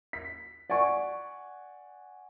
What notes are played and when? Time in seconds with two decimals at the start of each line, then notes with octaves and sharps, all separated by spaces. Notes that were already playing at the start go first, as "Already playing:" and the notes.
0.13 B6
0.70 D5 F#5 G#5 C#6